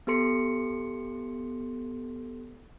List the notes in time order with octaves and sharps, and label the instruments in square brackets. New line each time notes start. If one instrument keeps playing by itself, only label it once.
[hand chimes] B3 G4 A4 C6 C#7